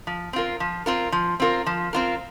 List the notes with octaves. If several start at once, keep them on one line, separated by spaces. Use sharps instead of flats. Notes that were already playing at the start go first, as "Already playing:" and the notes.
F3
C4 F4 A#4
F3
C4 F4 A#4
F3
C4 F4 A#4
F3
C4 F4 A#4